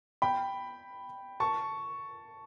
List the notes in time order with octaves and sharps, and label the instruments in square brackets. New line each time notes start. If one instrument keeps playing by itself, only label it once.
[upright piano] G5 B5
A5 C#6